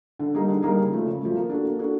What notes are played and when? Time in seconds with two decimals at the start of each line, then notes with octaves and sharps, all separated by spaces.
0.19 D3
0.34 G3 A#3 D#4 G#4
0.48 D3
0.62 G3 A#3 D#4 G#4
0.78 C#3
0.92 F3 A3
1.06 C#3
1.21 F3 A3
1.35 A#3
1.49 D4 F#4 A4
1.65 A#3
1.79 D4 F#4 A4